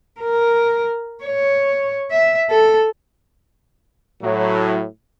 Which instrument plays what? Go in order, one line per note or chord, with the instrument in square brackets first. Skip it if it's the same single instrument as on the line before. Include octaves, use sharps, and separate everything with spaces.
[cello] A#4
C#5
E5
A4
[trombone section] A2 F#3